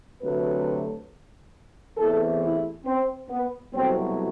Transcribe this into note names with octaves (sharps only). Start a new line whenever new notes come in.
D2 C3 F#3 A3 B4
E2 C3 E3 A3 A4
E4
C4
B3
C2 B2 F#3 A3 C4